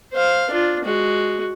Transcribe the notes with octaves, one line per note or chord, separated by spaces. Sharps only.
C5 F5
D4 F4
G#3 F#4